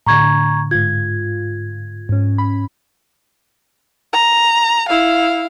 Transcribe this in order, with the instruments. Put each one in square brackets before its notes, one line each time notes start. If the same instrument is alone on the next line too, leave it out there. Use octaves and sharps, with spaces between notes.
[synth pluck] A2 D3 [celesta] A#5 C#6 G#6
[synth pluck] G#2 F4 [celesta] G#6
[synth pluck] G#2 C#4
B5
[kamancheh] A#5
E4 F5